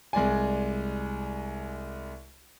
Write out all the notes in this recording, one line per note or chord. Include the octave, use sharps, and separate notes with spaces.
C2 G#3 D5 G#5